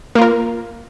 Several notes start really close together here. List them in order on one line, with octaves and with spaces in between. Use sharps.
A#3 F4 A#4